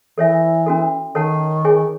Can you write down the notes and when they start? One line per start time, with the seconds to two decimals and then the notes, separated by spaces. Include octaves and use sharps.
0.17 E3 A4 C#5 E5 G#5
0.66 C#4 F#4 A4
1.15 D#3 A4 C#5 F#5 A5
1.65 G#4 C#5 G#5 C#6